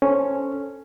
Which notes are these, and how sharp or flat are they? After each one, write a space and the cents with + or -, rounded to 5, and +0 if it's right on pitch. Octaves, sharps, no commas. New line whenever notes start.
C#4 +0 A4 +0 C5 +5